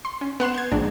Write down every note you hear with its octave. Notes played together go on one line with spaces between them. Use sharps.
C6
C#4
B3 F#5 C6 E7
G6 G#6
A#1 G#2 D4